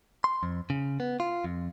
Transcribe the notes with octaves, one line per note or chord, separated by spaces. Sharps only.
C6
F2
C#3
B3
F4
F2